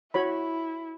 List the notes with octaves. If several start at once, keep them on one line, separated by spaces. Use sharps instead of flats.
E4 F#4 C#5 B5